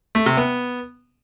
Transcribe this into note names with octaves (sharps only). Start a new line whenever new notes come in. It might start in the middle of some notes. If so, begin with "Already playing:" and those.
A3
C3
B3